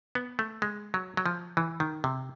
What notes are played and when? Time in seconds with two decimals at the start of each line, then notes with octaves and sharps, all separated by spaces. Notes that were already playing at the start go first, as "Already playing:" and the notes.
0.15 B3
0.39 A3
0.62 G#3
0.94 F#3
1.17 F#3
1.26 F3
1.57 E3
1.80 D#3
2.04 C3